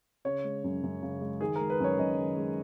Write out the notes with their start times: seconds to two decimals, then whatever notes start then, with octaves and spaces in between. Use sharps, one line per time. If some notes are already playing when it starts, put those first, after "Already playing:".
0.25 C#3 C#5
0.44 G#3
0.64 F#2
0.83 F#2
1.03 C#3
1.21 G#3
1.41 D#3 G#4
1.56 G#3 A#4
1.70 B4
1.80 F#2 C#5
1.99 F#2 D#5
2.18 D#3
2.37 G#3